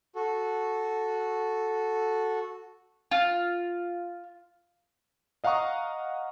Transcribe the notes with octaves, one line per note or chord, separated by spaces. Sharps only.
F#4 A4
F4
D#5 F5 F#5 A#5 C#6 D#6